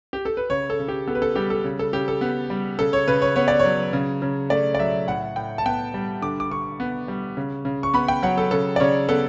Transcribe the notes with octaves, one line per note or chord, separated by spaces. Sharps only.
G4
A4
B4
C#3 C#5
A4
C#3
G4
B3 A4
B4
A4
G3 G4
A4
C#3
A4
C#3 G4
A4
B3
G3
C#3 A4
C#5
C#3 B4
C#5
B3 C#5
D5
C#5
F#3
C#3
C#3
A3 D5
D5
F#3 E5
A2 F#5
A2 G5
A5
B3 G5
G3
D3 D6
D6
D3 C#6
B3
G3
C#3
C#3
C#6
B3 B5
G5
F#3 F#5
A4
C#3 A4
D5
C#3 C#5
B3 A4